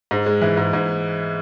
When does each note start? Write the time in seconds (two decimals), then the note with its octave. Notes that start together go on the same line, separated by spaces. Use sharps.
0.11 G#2
0.26 G#3
0.42 E3
0.57 G#2
0.73 G#2